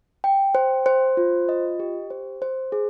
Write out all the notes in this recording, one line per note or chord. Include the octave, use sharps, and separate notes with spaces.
G5
C5
C5
F4
D#5
G4
C5
C5
G#4